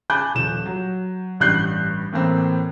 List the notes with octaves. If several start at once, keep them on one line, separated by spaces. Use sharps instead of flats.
G#5 A5 B5 D6 F#6 G6
D#1 F3 E7
F#3
A1 G2 G3 F#6 G6 C7
A2 E3 A#3 C4